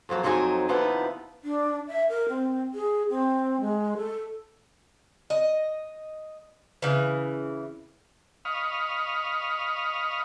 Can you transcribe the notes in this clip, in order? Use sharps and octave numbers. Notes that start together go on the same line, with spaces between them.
F2 F3 F#3 A#3
F2 F#3 C4 D#4 A4 G#5
D#2 C3 F3 B3 D#4 E4
D4
E5
A#4
C4
G#4
C4
G#3
A4
D#5
C#3 E3
D#5 F5 B5 C#6 D#6 F6